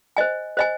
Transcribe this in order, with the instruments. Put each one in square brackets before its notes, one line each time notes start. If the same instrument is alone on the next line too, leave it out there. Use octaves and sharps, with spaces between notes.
[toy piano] C5 D#5 G#5
C5 D#5 G#5